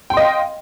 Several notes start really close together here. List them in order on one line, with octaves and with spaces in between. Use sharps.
G5 C6 D#5 F5